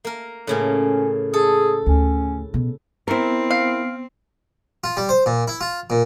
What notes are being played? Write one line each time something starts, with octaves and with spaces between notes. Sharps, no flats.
A#3 A#4
A2 C#3 A#3 C#4
G#4 A4
D2 C#4
B2
B3 C4 E4 A#4
F5
F4
G3
C5
A#2
E4
F4
A#2